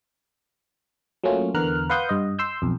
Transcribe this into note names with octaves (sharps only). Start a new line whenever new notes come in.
F#3 A3 A#3 C#4 F4
E2 D3 B3 A#4 F6 F#6
B4 F5 F#5 C6 D#6 G6
G2 D#5
C6 E6 G6
B1 F2